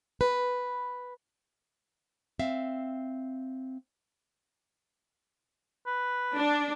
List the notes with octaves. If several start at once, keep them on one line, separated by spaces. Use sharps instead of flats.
B4
C4 E5 F5
B4
D4